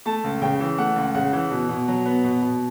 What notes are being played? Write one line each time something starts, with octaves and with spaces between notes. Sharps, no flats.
A3 A5
C#2
C#3 G5
E3
A3 F#5
C#2
C#3 F#5
E3
B2
B2
F#3
B3
B2
B2